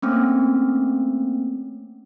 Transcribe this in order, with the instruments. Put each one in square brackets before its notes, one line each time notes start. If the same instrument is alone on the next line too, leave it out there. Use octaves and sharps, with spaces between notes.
[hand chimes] A3 A#3 C4 C#4